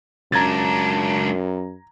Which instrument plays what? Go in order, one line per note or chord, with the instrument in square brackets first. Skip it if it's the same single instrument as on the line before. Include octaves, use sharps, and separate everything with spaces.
[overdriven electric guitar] C#2 D4 [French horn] F#2 [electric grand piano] A#5 G#6 A6